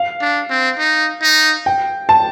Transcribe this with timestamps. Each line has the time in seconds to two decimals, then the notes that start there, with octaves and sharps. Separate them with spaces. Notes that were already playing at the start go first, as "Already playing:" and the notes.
Already playing: F5
0.21 D4
0.50 C4
0.79 D#4
1.22 D#4
1.66 G5
2.09 A5